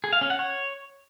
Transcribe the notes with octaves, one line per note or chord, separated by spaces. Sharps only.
G#4
F5
C#4
F#5
C#5